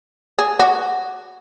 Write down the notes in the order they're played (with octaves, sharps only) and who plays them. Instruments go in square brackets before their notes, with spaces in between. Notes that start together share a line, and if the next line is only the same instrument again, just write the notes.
[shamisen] G#4
F#4